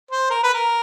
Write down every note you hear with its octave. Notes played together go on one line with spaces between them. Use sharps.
C5
A#4
B4
A#4